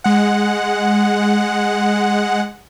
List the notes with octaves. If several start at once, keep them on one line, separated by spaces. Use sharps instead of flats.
G#3 F#5